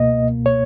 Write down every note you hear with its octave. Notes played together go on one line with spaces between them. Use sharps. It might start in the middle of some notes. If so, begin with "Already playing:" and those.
Already playing: C#2 B2 A#3 D#5
C#5